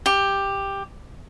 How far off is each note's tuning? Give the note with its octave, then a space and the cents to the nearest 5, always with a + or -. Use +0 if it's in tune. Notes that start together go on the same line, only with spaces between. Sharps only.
G4 +10